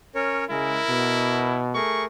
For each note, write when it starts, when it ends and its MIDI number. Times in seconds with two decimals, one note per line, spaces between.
0.15 0.45 61
0.15 0.45 70
0.15 0.45 73
0.50 0.78 49
0.50 0.78 56
0.50 1.61 64
0.50 1.47 70
0.88 1.75 47
1.75 2.05 57
1.75 2.05 68
1.75 2.05 70
1.75 2.04 85